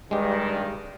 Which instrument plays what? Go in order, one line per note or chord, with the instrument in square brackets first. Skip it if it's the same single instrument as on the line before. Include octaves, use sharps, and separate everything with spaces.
[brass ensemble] G2 D#3 [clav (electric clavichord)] G#3 G4